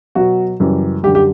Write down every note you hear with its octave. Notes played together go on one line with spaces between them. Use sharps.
B2 F#3 F#4
F#2 C#3 E3 G3
F#2 D3 G3 G4
G4